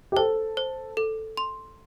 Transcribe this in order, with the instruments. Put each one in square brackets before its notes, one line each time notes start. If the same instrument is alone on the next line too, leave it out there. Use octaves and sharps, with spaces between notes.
[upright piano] G4
[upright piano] A4 [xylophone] C5
[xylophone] C5
A4
C6